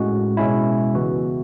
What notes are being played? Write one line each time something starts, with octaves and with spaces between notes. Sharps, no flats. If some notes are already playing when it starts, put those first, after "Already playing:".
Already playing: A2 G#3 C#4 F#4
B2 G#3 C#4 E4
C#3 E3 B3 F#4